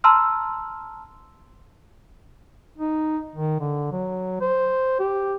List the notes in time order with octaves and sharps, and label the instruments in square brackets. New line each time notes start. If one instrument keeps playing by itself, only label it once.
[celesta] A5 A#5 C6 E6 F6
[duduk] D#4
D#3
D3
F#3
C5
G4